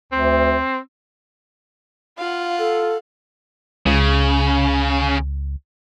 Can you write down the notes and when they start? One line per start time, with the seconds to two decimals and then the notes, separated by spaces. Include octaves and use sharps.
0.12 D2 C4
2.18 F4 F5 F#5
2.59 A4
3.86 C#2 C#3